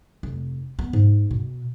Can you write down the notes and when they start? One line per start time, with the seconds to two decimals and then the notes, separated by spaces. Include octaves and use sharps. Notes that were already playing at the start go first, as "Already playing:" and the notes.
0.23 F1
0.79 B3
0.93 G#2
1.31 B2